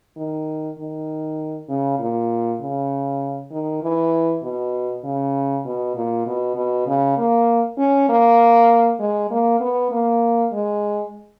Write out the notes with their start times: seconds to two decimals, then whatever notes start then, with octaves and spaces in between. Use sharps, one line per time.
0.17 D#3
0.79 D#3
1.70 C#3
1.99 A#2
2.61 C#3
3.52 D#3
3.83 E3
4.43 B2
5.04 C#3
5.65 B2
5.96 A#2
6.26 B2
6.56 B2
6.87 C#3
7.18 A#3
7.78 C#4
8.09 A#3
9.00 G#3
9.31 A#3
9.60 B3
9.92 A#3
10.53 G#3